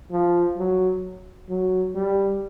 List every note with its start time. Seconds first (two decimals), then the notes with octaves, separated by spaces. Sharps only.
0.11 F3
0.57 F#3
1.49 F#3
1.95 G3